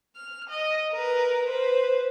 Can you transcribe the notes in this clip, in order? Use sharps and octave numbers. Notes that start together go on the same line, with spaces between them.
F6
D#5
A#4 B4
B4 C5